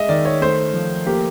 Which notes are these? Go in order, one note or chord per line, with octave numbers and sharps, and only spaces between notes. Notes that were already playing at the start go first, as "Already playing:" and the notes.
Already playing: G#3 D#5 E5
D#3 D5
C#5
A3 C5
F3
A#3 G4